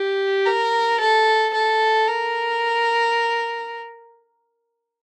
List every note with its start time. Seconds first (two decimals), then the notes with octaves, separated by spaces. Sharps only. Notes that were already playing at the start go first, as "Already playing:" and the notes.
Already playing: G4
0.45 A#4
1.00 A4
1.53 A4
2.08 A#4